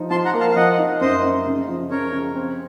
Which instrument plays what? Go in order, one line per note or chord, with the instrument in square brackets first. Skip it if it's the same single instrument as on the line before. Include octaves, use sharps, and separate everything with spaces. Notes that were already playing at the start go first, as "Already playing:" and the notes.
Already playing: [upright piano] F3 D#4
[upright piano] F3 [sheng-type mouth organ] A5 C6
[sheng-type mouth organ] F#5 A#5
[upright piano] A#3
[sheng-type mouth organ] F5 A5
F5
[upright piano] F3 [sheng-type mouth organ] D#5 F#5
[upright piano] D#4
[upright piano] F#2 [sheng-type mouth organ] C5 D#5
[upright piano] D#4
C#3
F3
[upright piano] C#3 [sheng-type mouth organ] A#4 C#5
[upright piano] C#3
C4